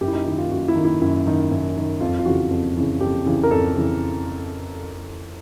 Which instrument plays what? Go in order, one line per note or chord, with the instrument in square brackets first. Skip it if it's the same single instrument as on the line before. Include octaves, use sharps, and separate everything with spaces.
[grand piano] F#2 G4
E4
D#4
D#3 E4
F4
F#2 F#4
E4
D#3
E4
F#2 E4
D#3
F#2
D#3
F2 F4
F4
C#3 E3 F#4
F2
C#3 E3
F2 G4
C#3 E3
A#4
F2 A4
C#3 E3